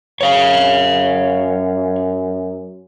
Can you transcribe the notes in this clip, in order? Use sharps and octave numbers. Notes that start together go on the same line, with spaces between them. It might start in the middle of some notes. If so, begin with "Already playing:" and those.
F#2 C#5 F5